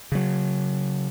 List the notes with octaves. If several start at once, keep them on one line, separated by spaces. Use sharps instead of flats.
C#3 F#3